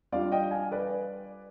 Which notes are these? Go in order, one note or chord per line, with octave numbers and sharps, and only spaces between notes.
G3 D4 F4 D5 F5
D#5 G5
F5 G#5
B4 D5